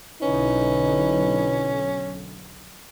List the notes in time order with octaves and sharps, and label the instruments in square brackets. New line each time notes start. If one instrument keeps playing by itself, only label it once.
[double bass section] B1 D3 [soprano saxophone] C#4 [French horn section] D#4 E4 B4